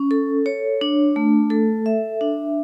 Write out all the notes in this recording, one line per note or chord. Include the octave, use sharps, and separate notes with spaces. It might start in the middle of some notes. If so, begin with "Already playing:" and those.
Already playing: C#4
A4
C#5
D4
A3
A4
E5
D4